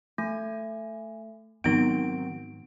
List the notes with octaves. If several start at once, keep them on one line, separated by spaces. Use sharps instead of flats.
A3 G#5
G#2 D#3 F#3 B3 C4 D#4 D7